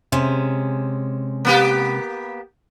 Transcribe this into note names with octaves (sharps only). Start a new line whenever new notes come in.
C3 G#3 C#4
A#3 B3 G4